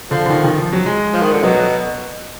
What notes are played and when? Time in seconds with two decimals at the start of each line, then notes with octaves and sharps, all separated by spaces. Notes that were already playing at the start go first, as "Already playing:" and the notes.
0.10 D3 F3
0.26 D3
0.30 D#3
0.44 D#3
0.58 F3
0.73 F#3
0.86 G#3
1.13 F3
1.22 D#3
1.32 D3
1.43 B2 F#3